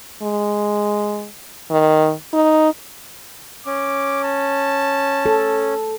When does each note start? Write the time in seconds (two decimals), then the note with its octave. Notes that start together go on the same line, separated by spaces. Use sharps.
0.23 G#3
1.71 D#3
2.34 D#4
3.66 C#4 D6
4.24 A5
5.26 A4